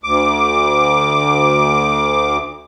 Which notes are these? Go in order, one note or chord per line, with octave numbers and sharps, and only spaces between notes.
D2 D6